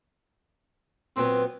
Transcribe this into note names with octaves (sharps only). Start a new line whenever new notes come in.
A#2 F#3 B3 C4